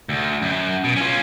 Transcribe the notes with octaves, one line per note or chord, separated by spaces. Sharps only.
D2
F#2
B2
C#4 F4